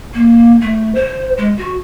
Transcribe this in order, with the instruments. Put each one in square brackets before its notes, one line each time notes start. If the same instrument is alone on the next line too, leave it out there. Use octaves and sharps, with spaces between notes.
[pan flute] A#3
A3
C5
G#3
F#4